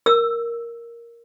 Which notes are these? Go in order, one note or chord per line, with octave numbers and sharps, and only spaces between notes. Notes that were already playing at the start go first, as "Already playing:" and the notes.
A#4 E6